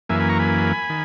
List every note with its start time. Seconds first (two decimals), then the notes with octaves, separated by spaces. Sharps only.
0.09 F#2 E3 A#3 E5 G#5
0.19 G#5 B5
0.29 A#5 C#6
0.39 G#5 B5
0.90 D#3